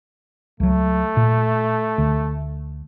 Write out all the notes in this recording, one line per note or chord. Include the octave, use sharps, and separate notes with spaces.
C#2 F#3 A3
A#2
D2